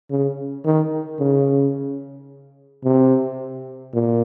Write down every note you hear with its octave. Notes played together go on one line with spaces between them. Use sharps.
C#3
D#3
C#3
C3
A#2